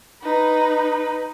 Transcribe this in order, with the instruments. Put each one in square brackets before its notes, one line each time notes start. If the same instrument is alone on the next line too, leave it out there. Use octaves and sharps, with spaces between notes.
[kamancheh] D#4 B4